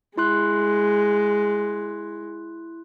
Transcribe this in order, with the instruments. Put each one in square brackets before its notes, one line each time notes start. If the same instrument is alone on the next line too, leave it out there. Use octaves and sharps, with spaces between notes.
[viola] G#3 [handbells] E4 C6 F#6